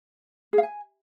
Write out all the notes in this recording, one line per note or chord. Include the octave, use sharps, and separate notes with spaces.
G#4
F5
G#5